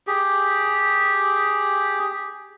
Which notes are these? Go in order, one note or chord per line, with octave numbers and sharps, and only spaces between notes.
G4 G#4